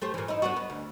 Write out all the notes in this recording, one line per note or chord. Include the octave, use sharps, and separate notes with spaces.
A3 G4 C5
A#2 E3
D#4 E4
B3 D4 F#4
B3
D2